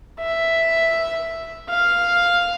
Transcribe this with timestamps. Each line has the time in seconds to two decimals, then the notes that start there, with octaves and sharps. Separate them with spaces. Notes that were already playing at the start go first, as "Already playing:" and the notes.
0.20 E5
1.70 F5